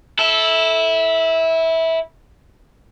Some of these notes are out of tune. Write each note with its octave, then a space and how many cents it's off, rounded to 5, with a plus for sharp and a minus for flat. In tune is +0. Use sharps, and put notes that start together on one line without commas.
E4 -15 A4 +0